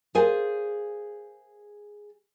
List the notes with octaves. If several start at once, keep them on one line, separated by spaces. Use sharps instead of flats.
G#4 A#4 C5 D5 F5 G#5